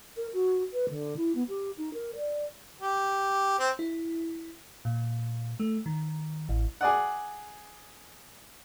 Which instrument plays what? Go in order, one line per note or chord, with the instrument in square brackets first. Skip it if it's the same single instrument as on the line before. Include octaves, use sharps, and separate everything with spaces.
[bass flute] A#4
F#4
B4
D3
E4
B3
G4
D#4
A#4
D5
[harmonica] G4
C4
[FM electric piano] E4
A#2
A3
D#3
A1
[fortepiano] G#4 D5 F#5